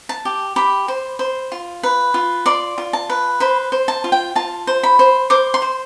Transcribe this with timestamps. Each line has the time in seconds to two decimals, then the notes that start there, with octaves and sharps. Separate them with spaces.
0.09 A5
0.25 G4
0.56 G4 B5
0.88 C5
1.19 C5
1.52 F4
1.83 B4
2.14 F4
2.46 D5 C6
2.78 F4
2.93 A5
3.10 B4
3.40 C5 B5
3.72 C5
3.88 A5
4.04 F4
4.12 G5
4.36 F4 A5
4.67 C5
4.83 B5
4.99 C5
5.30 C5 D6
5.54 C6
5.62 C5